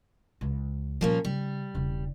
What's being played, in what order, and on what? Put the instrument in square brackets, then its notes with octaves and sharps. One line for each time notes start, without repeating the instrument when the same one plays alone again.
[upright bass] C#2
[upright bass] A#2 G3 [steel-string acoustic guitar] F3 A#3 C#4
[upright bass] C#3 [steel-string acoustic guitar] G3
[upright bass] E1 C#3